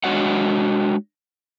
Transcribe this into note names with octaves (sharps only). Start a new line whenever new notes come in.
G#3 D4 F#4 C#5 D#5 F#5